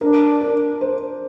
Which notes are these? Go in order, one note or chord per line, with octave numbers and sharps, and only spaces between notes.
D4 A#4
A#4
C5